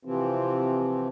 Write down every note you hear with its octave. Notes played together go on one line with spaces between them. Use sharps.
C3 E3 F3 C4